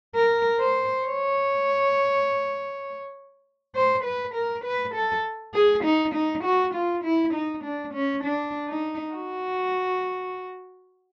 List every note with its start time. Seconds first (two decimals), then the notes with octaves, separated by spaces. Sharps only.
0.15 A#4
0.60 C5
1.06 C#5
3.75 C5
4.04 B4
4.35 A#4
4.65 B4
4.95 A4
5.55 G#4
5.85 D#4
6.15 D#4
6.44 F#4
6.74 F4
7.04 E4
7.34 D#4
7.64 D4
7.94 C#4
8.24 D4
8.69 D#4
9.14 F#4